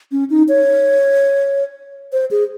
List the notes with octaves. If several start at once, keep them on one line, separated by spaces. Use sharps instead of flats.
C#4
D#4
C#5
C5
G#4